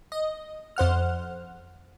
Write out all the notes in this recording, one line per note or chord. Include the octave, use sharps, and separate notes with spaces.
D#5
F2 C5 F#5 F6